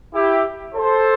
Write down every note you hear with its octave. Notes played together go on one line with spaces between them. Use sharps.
E4 G4
A4 C5